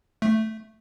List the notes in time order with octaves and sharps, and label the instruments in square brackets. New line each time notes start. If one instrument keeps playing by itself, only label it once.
[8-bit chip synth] A3